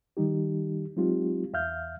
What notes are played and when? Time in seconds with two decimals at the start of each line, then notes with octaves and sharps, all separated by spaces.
0.17 D#3 G3 D#4 G4
0.97 F#3 G#3 C4 D#4 F4 G4
1.53 E2 E5 F5 F6 G6